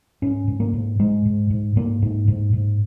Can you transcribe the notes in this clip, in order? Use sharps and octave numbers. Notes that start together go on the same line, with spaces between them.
G#2 C#4
G#2
A#3
G#2
G#2 G#3
G#2
G#2
G#2 A#3
G#2
G#2
G#2